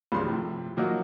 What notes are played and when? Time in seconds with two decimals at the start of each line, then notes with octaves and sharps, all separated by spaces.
0.12 C2 G2 C#3 F3 C6
0.24 A2 C3 F3
0.77 A#2 F3 F#3 A#3 D#4 F#4